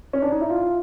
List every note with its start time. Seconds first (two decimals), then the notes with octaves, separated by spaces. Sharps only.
0.13 C#4
0.22 D4
0.31 D#4
0.41 E4
0.50 F4